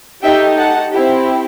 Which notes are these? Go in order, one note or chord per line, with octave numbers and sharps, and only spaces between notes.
A3 D#4 G4 E5 G5
F#5 A5
C4 E4 G4